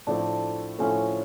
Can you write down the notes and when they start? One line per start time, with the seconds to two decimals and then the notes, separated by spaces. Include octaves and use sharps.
0.07 A2 F3 A3 C4 D4
0.79 A2 F3 A3 C4 C#4